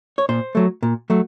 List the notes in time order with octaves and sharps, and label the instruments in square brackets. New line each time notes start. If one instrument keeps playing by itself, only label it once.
[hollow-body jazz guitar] C#5
A#2 C5
F#3 A3
A#2
F#3 A3